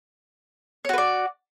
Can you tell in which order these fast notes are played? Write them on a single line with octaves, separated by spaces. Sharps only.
C#5 F#4 B4 D5